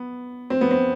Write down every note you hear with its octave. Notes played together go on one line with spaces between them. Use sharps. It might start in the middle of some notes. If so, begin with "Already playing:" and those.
Already playing: B3
C4
B3
C4